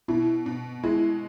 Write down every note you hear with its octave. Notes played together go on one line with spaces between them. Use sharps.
B2 E4
B2
G#3 E4